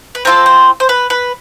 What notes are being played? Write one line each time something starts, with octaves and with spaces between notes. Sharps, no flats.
B4
C4 F4 A4 A#4
C5
C5
B4
B4